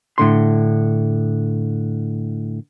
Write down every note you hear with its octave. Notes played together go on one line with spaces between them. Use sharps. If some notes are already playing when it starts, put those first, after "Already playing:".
A2 D3 C6